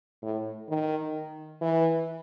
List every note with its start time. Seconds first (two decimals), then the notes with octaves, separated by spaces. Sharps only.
0.22 A2
0.69 D#3
1.61 E3